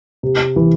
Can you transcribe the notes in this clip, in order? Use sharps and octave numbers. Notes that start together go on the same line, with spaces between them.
C3
E3